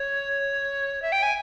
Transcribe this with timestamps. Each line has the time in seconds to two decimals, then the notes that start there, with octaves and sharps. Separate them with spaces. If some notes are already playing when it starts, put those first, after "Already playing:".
Already playing: C#5
1.02 E5
1.12 G5
1.23 G#5